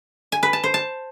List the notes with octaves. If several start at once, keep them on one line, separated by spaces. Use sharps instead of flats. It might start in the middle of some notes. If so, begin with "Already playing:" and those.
G#5
B4
A5
C5
A5